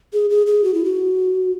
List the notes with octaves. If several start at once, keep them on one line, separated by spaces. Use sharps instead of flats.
G#4
G#4
G#4
F#4
E4
F#4